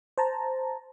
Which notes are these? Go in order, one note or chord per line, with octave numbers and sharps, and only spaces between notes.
C5 A5 A#5